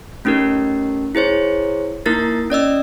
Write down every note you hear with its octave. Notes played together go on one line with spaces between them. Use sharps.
A3 C#4 D#4 G4 A#4
E4 G#4 C5 C#5
A#3 D#4 E4 A#4 A6
C#4 D5 D#5 E6